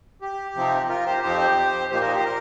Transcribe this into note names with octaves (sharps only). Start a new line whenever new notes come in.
G4
C3 F3 C4 D#4
F4 A#4
G4 C5
F2 F3 C4 D#4 G4 C5
A#2 F3 A#3 D#4 G4 C5
A#4 D#5
G4 C5
A#4